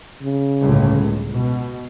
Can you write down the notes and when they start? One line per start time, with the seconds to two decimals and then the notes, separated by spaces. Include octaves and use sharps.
0.22 C#3
0.62 G1 C#2 A2
1.31 B2